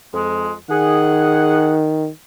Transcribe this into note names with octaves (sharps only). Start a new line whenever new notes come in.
F2 G#3
D#3 G#4 F#5